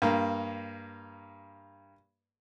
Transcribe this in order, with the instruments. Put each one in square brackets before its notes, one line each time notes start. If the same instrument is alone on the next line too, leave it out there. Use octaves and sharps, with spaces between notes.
[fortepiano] G2 A#3